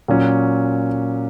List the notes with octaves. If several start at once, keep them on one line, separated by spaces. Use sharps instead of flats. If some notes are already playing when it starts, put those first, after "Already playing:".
A#2 F#3 C#4